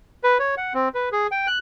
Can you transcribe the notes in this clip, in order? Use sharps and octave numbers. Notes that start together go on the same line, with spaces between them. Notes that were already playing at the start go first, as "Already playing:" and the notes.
B4
C#5
F#5
C4
B4
G#4
G5
F#6